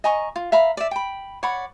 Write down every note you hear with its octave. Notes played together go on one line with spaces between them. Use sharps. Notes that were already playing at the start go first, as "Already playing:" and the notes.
D#5 G#5 A#5 C#6
F4
E5 F5 A#5 B5
D5 E5
G5 B5
C#5 D5 F#5 B5